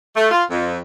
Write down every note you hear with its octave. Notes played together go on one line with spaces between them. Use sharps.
A3
F4
F2